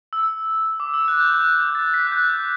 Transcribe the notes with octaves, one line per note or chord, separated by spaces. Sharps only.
E6
D6
E6
F#6
G6
F#6
F#6
G6
A6
B6
F#6
G6
G6